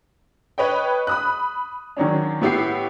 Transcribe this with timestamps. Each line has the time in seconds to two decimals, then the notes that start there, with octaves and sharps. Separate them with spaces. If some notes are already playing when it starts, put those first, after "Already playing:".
0.58 B4 C#5 D#5 G5
1.07 B5 D#6 F#6
1.97 D#3 F#3 C#4 D4
2.41 A2 B3 E4 G4 F#5 C7